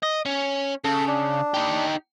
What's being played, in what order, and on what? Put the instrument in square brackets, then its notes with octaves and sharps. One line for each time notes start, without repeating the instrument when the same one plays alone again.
[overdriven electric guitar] D#5
C#4
[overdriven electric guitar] C#3 [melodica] A4
[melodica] D4
[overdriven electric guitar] D#4 G4